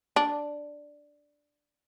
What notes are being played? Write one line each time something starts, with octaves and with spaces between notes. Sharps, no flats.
D4